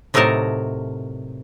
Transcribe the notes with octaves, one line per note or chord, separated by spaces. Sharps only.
A2 C3 F#3 D#4 A#4 A5